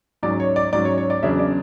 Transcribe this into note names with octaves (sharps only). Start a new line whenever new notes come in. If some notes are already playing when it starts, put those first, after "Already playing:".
G#2 F#3 C#4 D5
C#5
D5
G#2 F#3 C#4 D5
C#5
C#5
D5
E2 C#3 F#3 B3 D4 E5
D5